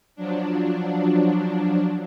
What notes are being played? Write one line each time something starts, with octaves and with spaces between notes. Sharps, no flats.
F3 F#3 D4